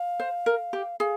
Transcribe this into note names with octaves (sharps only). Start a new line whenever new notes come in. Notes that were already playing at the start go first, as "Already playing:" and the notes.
Already playing: F5
C5
A#4
G4
G#4 F5